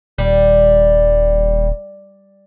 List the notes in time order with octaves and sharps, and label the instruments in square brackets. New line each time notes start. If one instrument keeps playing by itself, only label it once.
[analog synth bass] D#1 [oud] G3